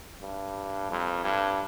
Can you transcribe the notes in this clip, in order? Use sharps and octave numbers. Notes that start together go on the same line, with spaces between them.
G2
F2
G2